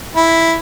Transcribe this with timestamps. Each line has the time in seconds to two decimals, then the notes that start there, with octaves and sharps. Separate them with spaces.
0.16 E4